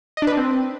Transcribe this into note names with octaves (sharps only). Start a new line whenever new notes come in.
D#5
D4
B4
D4
C4